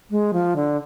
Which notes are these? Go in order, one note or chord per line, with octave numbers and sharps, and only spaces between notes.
G#3
F3
D3